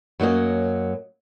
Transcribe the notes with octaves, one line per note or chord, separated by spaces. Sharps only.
F#2 F#3 A#3 D#5